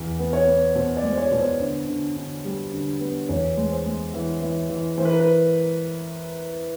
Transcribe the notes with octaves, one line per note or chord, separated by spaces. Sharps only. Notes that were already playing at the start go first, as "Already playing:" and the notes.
Already playing: E2
B3
C#5
B3
B2 C5
D5
G#3
C5
C#5
B2
C5
D3 C5
D3
D3
G3
D3
B3
E2 C#5
G#3
C5
G#3
E3
E3
E3
E3 C5
B4
A#4
B4